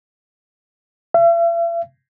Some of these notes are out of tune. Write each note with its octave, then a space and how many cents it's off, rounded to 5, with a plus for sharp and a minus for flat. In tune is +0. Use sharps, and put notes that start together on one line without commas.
E5 +45